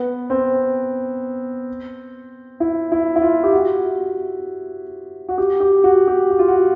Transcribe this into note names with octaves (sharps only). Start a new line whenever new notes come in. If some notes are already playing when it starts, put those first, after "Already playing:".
Already playing: B3
C4
E4
E4
E4
F4
G4
F#4
F#4
G4
G4
F#4
G4
F#4
F4
F#4